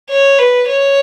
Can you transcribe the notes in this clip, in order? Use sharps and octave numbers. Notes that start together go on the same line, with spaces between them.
C#5
B4
C#5